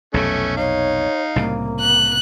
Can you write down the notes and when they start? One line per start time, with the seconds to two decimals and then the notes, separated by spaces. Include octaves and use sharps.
0.14 B1 F2 C3 A3 C#4
0.57 D#4 C#5 F5
1.36 C2 A2 C#3 A#3
1.82 F#6